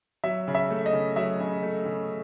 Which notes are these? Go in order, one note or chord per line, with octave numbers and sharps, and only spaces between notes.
F#3 E5
C#3
E5
A3
D#5
C#3
F#3 E5
C#3
A3
C#3